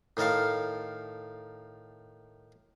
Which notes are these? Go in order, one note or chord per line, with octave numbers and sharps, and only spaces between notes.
A2 D#3 A4 A#4 F5